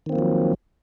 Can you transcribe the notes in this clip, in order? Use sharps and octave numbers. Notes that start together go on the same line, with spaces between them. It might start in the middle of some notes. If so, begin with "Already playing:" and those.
D#3 F3 F#3 A#3 C4